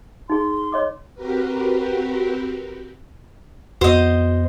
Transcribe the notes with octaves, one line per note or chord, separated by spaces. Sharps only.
D#4 G#4 C6
C#5 D#5 D6
C4 F#4 G4 A#4 B4
F2 B3 F#4 C5 D#5